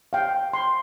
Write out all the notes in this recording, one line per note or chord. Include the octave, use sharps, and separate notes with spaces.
F5 G5
C6